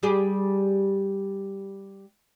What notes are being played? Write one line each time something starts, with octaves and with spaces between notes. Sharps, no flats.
G3 G4 G#4